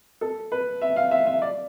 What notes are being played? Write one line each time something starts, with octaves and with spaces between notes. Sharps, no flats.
A4
B4
E5
F5
E5
E5
D5